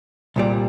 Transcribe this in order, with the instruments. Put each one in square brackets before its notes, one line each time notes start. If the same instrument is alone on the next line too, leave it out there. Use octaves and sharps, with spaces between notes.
[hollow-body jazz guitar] C2 A#2 G3